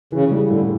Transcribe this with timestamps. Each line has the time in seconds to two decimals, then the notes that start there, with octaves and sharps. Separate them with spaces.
0.12 C#3 E3
0.31 G3
0.50 A2 D3